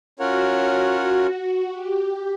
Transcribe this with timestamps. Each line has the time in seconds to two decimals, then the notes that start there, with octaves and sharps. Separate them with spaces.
0.19 C#4 F4 F#4 A#4 C#5 F#5
1.72 G4